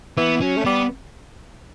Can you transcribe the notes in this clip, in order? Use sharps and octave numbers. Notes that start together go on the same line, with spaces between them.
E3 B3
F#3 C#4
A3
G3 B3